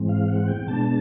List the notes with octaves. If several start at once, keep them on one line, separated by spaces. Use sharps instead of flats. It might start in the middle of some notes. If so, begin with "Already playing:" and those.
Already playing: G#2 E3 G#3 C4
F5
F#5
G5
B2 G#3 B3 D4 A5